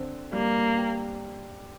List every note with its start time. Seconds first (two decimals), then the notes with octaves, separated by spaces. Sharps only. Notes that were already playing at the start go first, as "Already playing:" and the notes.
Already playing: D3 C4
0.33 G3 A#3
0.78 G4